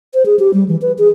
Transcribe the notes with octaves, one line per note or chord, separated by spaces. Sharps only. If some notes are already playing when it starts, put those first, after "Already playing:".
C5
G#4
G4
G3
E3
B4
G#4